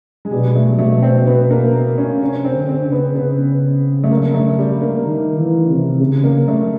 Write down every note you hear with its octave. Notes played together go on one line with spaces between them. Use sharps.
G#3
B2 G3
A3
B2 A3
C4
B3
A#3
C#4
C3 C#4
C4
D3
C4
C#3
B3
C#3 B3
A3
A#3
A3
G3
A#3
D#3
E3
C3
C#3
A#3
A3